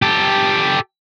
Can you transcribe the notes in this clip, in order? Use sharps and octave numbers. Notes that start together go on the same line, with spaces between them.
G4 A4